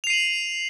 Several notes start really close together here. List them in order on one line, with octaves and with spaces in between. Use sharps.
F7 C7 D#7 F#7